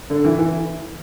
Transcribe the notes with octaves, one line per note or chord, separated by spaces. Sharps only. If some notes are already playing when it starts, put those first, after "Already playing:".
D3
E3
E3